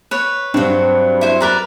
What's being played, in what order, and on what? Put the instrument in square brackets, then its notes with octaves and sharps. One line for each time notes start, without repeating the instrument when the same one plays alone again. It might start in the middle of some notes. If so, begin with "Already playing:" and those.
[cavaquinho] B4 C#5
[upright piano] G2 [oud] F#3 C4
[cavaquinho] E4 C5
[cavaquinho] A#4 B4 D5 [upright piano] A#5